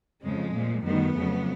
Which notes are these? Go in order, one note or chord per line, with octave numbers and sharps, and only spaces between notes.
F2 C#3 F3 G#3
A#2 F3
F#2 D#3 G3 A3 B3
F2 C#3 F#3